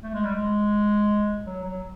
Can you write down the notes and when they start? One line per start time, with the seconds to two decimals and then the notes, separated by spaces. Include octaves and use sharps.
0.03 A3
0.14 G#3
0.25 G3
0.35 G#3
1.45 F#3
1.63 F#3